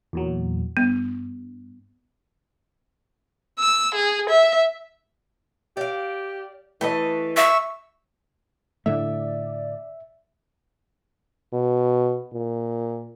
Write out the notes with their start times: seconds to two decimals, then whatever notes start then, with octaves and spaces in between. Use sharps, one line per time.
0.13 E2 A#2 F#3
0.77 G2 B3
3.59 E6
3.95 G#4
4.29 E5
5.77 G4 D5 F5
6.81 E3 A3 B4 D#5
7.37 E5 C#6 E6
8.86 A2 D3 A3 D5 E5
11.53 B2
12.33 A#2